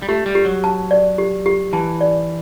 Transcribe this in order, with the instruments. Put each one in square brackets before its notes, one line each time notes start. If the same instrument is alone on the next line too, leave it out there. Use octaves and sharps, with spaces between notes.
[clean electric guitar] G3
[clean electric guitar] A3 [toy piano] G4
[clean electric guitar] G3
[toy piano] G4
[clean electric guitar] F#3
[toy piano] A5
D5
G4
G4
[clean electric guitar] E3 [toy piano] A5
[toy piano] D5